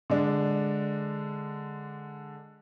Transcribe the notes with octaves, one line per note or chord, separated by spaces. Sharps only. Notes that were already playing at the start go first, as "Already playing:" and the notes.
D3 G#3 D4